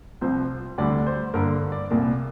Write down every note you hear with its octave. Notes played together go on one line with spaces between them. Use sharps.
C2 C3 F3 C4 C5
D2 D3 G3 D5
C5
G2 D3 A#3 A#4
D5
C2 A#2 A#3